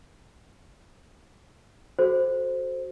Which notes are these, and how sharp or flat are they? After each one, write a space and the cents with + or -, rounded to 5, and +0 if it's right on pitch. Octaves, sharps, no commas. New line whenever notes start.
F#4 +0 A4 -20 C5 +0